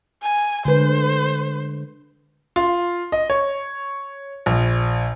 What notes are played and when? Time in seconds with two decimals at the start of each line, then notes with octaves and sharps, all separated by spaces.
0.22 G#5
0.65 D3 G#3 B4 C5
2.56 F4
3.12 D#5
3.30 C#5
4.46 A#1